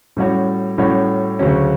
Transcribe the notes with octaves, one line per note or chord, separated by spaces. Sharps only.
A2 G3 C#4 F#4 C#5
A2 G3 C#4 F#4 C#5
D2 C#3 F#3 C#4